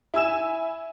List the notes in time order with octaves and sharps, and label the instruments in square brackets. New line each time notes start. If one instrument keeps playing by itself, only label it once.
[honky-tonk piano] E4 G#5 E6 E7